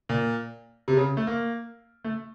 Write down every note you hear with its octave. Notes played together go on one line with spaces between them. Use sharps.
A#2
C3
C#3
A3
A#3
A3